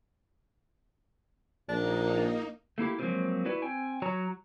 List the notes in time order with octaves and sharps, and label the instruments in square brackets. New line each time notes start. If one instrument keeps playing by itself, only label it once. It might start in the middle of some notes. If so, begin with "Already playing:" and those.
[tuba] A#1 [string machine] A#3 D#4 [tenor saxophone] D4
[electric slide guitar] A3 A#3 E4 G4
F3 F#3 G#3 A#3 C4 F4
E4 F#4 B4 D5
C4 G5 G#5
F#3 F#4 C#5 A#5